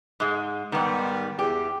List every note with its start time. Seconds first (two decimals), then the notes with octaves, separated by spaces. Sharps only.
0.20 G#2 G#3
0.72 G#2 D#3 G3 B3
1.39 E2 G4